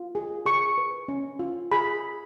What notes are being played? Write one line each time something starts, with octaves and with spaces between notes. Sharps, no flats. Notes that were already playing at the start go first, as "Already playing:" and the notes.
Already playing: F4
G#4
G#4 C#6
B4
C#4
F4
G#4 B5